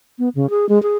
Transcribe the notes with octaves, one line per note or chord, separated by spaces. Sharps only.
B3
C#3
G#4
G#3
G#4